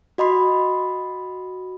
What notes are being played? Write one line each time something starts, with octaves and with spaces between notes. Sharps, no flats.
F#4 D#5 B5 C6